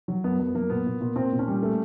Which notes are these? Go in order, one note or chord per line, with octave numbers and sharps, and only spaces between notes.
F#3
F#2 B3
F#2 B3
F#3 A#3
A#2 B3
A#2
A#2
A#2 C4
A#2
C#4
G3
A3